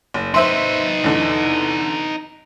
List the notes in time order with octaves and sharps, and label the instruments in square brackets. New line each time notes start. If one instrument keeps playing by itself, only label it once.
[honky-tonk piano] F#1
[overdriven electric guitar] D#4 B4 [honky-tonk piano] C5 E5 C6
[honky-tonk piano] E2 D3